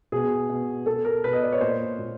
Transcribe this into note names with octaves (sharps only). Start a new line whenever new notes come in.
B2 G#4
B2
B2 A4
A#4
B2 B4
D#5
D5
C#5
A#2 C5
A#2